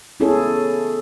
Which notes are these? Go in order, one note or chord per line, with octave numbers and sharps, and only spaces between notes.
B3 C#4 E4 G#4 A4 C#5